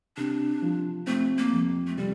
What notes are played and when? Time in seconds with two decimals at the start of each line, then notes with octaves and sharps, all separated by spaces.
0.17 C3 D4
0.62 F3
1.07 A3 C4
1.38 A#3
1.53 F2
1.87 A3
1.97 C3 G3